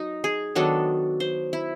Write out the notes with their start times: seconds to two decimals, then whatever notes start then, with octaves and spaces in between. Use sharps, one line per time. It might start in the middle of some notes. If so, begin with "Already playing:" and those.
Already playing: F#3 D#4
0.24 G#4
0.55 D#3 F#3 B3 D4 A4
1.20 C5
1.53 E4